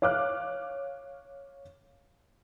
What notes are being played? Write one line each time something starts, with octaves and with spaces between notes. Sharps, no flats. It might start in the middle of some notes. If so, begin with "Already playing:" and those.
C#5 F5 D6 F6 F#6